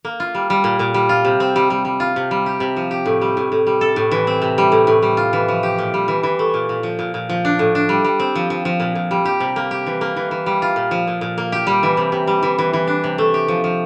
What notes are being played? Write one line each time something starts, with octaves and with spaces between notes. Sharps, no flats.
A#3
F4
G3
G3
A#2
A#2
G3
F4
C3
C4
G3
G3
G3
F4
C3
G3
G4
C3
F3
G4
A2
G3
A2
A2
G3
A4
A2
E3
C4
C3
G3
A2
A2
G3
F4
E3
F3
G4
A#2
G3
E3
E3
A3
A#2
A#2
F3
A#2
A#2
F3
D4
A2
D4
G3
G3
C4
F3
F3
F3
A#2
A#2
G3
G4
C3
A#3
G4
E3
A#3
E3
E3
G3
F4
A#2
F3
A#2
A#2
A#3
G4
G3
E3
C3
C3
G3
E3
E3
E3
D4
C3
A3
G4
F3
F3